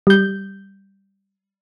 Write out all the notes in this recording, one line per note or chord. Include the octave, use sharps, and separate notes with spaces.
G3 G6